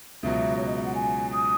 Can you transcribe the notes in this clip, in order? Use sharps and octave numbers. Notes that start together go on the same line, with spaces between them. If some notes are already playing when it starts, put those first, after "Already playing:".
C#2 B2 F#3 E5
C#5
D#5
E5
F#5
G#5
D#6